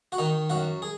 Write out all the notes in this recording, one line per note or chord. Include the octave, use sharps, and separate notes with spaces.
F#4
D#3 D#4
F#2 F#4
G#4